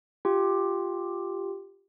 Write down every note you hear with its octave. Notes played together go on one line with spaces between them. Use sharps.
F4 G4